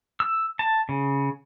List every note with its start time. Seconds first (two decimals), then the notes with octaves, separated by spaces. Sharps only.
0.20 E6
0.59 A5
0.89 C#3